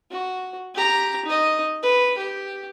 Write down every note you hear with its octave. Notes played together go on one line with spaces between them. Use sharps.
F#4
G4 A#5
D#4 D#5
B4
G4